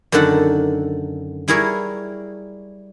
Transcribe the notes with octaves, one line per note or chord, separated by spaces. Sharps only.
F#2 D3 D#3 D4 A4 F#5
G3 E4 G#4 A#4 C#5